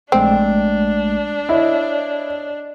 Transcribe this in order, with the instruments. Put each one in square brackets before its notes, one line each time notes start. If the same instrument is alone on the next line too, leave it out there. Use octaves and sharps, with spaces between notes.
[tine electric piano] A#1 G#3 A3 [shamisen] C4 [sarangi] D4
[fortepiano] E4 [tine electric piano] C#5 D#5